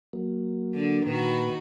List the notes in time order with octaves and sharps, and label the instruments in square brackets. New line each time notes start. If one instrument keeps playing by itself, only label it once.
[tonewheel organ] F#3 A#3
[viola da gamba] D3
[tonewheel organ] A#2 B4 [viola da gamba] D#3 D#4 F#4